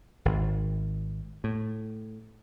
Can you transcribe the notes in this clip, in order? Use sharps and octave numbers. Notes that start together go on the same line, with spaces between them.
G#1
A2